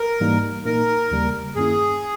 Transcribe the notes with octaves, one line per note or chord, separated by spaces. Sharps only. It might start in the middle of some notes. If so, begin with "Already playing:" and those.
Already playing: A#4
G#2 E3 G3 A#3 D#4
A#2 A#3 D#4 A#4
D#2 C#3 G3 A#3
G2 D#3 A#3 C#4 E4 G#4